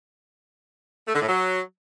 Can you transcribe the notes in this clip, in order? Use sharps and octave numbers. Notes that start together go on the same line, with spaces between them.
A3
D3
A2
F#3